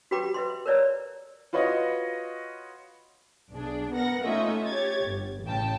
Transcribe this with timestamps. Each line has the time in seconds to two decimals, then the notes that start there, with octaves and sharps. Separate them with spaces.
0.11 F#4 G4 B4 G5 B5 D6
0.34 B4 E5 C6
0.66 A#4 B4 C#5 D5 E5 A#5
1.53 F4 F#4 B4 C#5 D#5
3.53 B1 D4 G#4
3.93 B3 A#4 F#5 A#6
4.25 A3 C#4 D#4 F4 D#5 E5
4.66 G4 C#5 G#6 A6
5.03 G1
5.44 A1 C#3 G5 A5